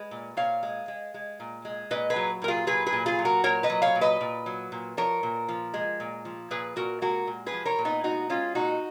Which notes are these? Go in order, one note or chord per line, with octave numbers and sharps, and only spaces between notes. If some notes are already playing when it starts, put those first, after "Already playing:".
Already playing: G#3 B4
A#2
A#2 C#5 F5
G#3
G#3
G#3
A#2
G#3
A#2 B4 D#5
G#4 B4
F#3
A#2 A#4
F4 G#4
F#3 G#4 B4
G#4 B4
A#2
F4 G#4
F#3
F#4 A#4
A#2 A#4 C#5
B4 D#5
F#3
C#5 F5
A#2
B4 D#5
A#2
F#3
A#2
F3 A#4 C#5
A#2
F3
G#3
A#2
F3
A#2 G#4 B4
A#2 F#4 A#4
G#3 F#4 A#4
A#2
G#4 B4
F3
A#4 C#5
A#2
B3 D#4
G#3 D#4 F#4
G#3 C#4 F4
A#2 D#4 F#4